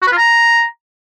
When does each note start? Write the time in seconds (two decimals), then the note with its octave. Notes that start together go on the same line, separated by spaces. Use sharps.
0.02 F#4
0.07 B4
0.12 F4
0.17 A#5